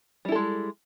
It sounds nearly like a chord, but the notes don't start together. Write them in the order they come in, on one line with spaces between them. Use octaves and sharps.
G3 E4 A4 G#3